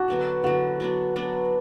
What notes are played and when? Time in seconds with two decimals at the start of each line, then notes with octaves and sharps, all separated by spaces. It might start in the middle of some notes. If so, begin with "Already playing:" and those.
Already playing: D4 F#4
0.08 D3 F#3 B3
0.44 D3 F#3 B3 F#4
0.80 F#3 B3 D4
1.16 F#3 B3 D4